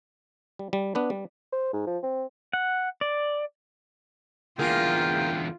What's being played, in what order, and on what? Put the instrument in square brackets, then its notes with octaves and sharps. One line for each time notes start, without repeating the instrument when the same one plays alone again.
[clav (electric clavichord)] G3
G3
B3 D4 B4
G3
[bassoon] C5
G#2
F3
C4
[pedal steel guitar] F#5
D5
[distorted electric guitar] E2 D3 [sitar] A#3 G#4 [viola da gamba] F4 [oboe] G5